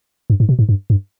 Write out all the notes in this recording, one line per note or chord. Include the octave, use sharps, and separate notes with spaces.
G2
G#2
B2
G#2
G2
G2